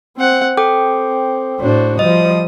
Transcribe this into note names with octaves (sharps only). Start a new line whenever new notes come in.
C4 F#5
C4 A4 G5 D6
A2 D4 F#4 C5
F3 G3 D#5 D#6